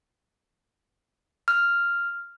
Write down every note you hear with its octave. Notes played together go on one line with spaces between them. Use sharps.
F6